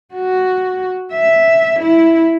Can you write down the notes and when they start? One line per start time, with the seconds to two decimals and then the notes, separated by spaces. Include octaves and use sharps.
0.14 F#4
1.12 E5
1.80 E4